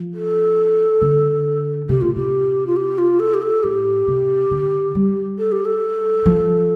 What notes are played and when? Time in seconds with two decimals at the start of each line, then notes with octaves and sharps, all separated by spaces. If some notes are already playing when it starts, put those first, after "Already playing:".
Already playing: F3
0.14 A4
1.02 D3
1.89 C3 G4
2.01 A2 F4
2.15 C3 G4
2.67 F4
2.76 G4
2.98 F4
3.20 A4
3.34 G4
3.42 A4
3.63 A2 G4
4.08 C3
4.51 D3
4.95 G3
5.38 A4
5.52 G4
5.65 A4
6.26 F3